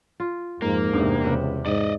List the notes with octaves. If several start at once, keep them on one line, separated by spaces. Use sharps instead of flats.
F4
F2 G#2 A#3
E2 G2 C3 D#4
C#2 B4 E5 F#5
G#2 D5 D#5